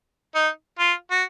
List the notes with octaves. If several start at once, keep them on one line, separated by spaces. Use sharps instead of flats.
D#4
F4
F#4